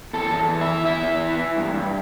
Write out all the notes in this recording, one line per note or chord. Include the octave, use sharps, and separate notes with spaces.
E2 A4
E2
E3
E5
E3
E2 E5
E2
E3
E3
G2
G2